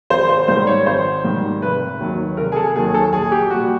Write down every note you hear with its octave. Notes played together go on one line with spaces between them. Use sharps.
G#1 C5
C5
G#2 D#3 G3 C5
C#5
G#1 C5
G#2 D#3 G3
F1 B4
D#2 D#3 F#3
F1 A#4
G#4
A4
D#2 D#3 F#3 G#4
A4
A#1 G#4
G4
A#2 G3 F#4